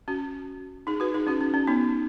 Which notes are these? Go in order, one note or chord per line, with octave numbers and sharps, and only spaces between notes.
C#4 F#4
D#4 G#4
F#4 B4
D#4 G#4
C#4 F#4
C#4
C#4
B3 D#4